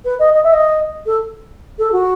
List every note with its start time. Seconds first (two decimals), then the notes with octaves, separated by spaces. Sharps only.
0.04 B4
0.19 D#5
0.34 D#5
0.44 E5
0.53 D#5
1.06 A4
1.78 A4
1.92 F#4